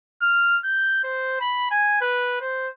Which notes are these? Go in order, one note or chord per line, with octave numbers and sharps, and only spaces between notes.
F6
G6
C5
B5
G#5
B4
C5